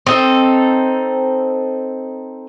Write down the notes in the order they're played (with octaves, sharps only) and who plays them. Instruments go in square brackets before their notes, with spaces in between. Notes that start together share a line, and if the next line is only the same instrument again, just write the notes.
[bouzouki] C4 D#4 A4